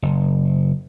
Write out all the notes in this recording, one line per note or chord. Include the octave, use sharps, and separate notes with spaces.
F#1